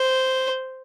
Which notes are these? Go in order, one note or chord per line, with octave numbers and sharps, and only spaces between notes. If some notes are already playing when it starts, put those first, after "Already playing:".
Already playing: C5